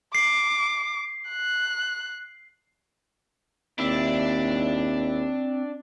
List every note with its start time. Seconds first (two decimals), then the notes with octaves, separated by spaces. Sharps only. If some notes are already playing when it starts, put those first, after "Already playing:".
0.15 D6 C7
1.29 F#6
3.79 D#2 C4 D4 E4 E5